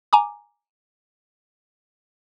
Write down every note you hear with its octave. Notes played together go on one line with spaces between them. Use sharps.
G#5 A#5 D6